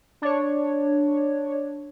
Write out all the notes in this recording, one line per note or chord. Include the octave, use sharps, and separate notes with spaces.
D4 C#5